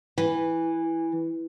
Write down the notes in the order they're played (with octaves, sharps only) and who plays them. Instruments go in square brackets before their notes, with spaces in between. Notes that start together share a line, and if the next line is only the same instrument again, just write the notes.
[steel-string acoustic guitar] E3